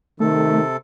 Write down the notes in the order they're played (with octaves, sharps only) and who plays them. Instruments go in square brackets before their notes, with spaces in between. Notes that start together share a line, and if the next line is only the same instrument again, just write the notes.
[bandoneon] C3 A4 [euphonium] D#3 [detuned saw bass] A3